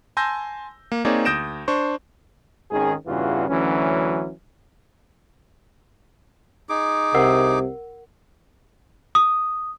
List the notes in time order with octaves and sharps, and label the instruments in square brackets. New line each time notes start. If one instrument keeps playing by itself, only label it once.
[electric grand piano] G#5 A5 C6 E6 G6 A#6
A#3
A#3 C4 D#4 G#4 C#5 D5
D2 D#6 G6 A#6 D7 E7
D4 C5 C#6
[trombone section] G#1 D#3 C#4 G#4
E2 G2 C#3 E3 F4 F#4
D2 E3 F#3 C#4
[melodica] D#4 G#4 D6
[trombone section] C2 C3 [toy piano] A#4 F#5
[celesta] D#6